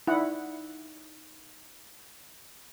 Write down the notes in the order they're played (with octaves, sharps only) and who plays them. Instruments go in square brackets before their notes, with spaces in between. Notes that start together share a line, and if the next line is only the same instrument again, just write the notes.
[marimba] D#4 D5 [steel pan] E4 F#5